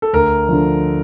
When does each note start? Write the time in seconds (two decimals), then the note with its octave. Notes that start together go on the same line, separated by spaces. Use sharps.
0.02 A4
0.13 D2 A#4
0.49 D3 F3